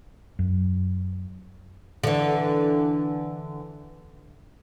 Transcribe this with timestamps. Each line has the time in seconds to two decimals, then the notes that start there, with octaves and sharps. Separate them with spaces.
0.39 F#2
2.04 D3 E3